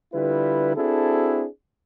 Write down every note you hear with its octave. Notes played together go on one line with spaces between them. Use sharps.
D3 G3 E4 F4 B4
C4 D4 E4 F#4 G#4 A4